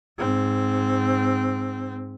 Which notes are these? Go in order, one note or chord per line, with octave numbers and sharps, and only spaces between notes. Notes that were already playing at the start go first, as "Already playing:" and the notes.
G#2 C4